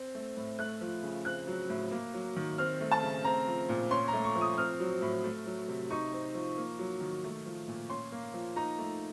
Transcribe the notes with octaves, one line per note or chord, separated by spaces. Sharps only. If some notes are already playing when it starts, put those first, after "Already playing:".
Already playing: C4
A3
A2
A3 F#6
F3
C#3
C4 F#6
F#3
A2
A#3
F#3
D#3
C4 F6
A3
A5
C#3
C4 A#5
F3
A#2
C#4 C6
A#5
A3
C#6
F3
D#6
C4 F6
F#3
A2
A3
F#3
C3
D#4 C#6
C4
F3
A#3
F#3
D#3
A3
F3
A#2
C#4 C6
A#3
F3
D#4 A#5
A3